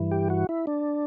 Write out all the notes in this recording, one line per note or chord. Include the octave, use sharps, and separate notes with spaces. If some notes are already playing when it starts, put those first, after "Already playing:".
Already playing: G2 E3
G4
F#4
E4
D4